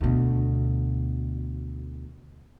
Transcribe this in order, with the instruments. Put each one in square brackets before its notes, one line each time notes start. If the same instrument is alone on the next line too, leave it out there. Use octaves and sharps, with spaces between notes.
[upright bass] D2 B2